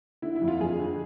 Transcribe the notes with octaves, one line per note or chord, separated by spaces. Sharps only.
D3 E4
E4
F2
F4
F2 G#4
D3